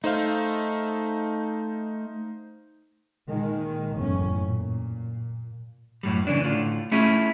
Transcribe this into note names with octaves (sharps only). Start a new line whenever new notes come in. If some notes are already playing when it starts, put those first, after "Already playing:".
A3 D#4 C5 F5
A#2 D#3 G#3
F#1 E2 A2 C#4
A#2
F#2 A2 G3
C#3 E3 D4
A2 D3 F4
A3 C#4 E4 F4 G#4